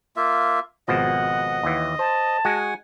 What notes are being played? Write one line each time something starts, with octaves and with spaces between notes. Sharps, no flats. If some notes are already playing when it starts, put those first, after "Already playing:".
A#3 F4 E5
G#1 B2 F3 D#5 F#5
D#2 E3
C5 A5
G#3 F#4 F#5 G#5